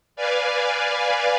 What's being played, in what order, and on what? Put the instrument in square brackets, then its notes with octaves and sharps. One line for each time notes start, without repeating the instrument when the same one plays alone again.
[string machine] B4 D5 F5 G#5